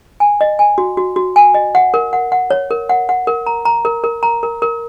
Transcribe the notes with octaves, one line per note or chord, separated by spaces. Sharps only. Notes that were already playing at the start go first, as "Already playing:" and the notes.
G#5
D#5
G#5
F#4
F#4
F#4
G#5
D#5
F#5
A#4
F#5
F#5
C#5
A#4
F#5
F#5
A#4
A#5
A#5
A#4
A#4
A#5
A#4
A#4